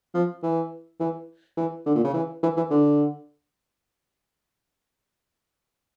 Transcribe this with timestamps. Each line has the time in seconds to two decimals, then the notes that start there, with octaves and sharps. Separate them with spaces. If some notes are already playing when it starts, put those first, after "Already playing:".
0.14 F3
0.43 E3
1.00 E3
1.57 E3
1.86 D3
1.95 A#2
2.04 C#3
2.14 E3
2.43 E3
2.57 E3
2.70 D3